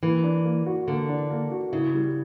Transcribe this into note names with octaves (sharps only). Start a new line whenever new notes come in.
E3 A#3
D4
A#3
F#4
D3 A#3
D4
A#3
F#4
C#3 E4
G3